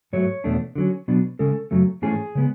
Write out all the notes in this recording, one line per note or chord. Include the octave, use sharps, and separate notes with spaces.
G#2 F#3 A3 C#5
E2 B2 A3 D4
D3 F#3 C#4
B2 F#3 B3 D4
C#3 G#3 C#4 A4
F#2 C#3 F#3 A3
G#2 E3 A3 C#4 G#4
C#3 G#3 B3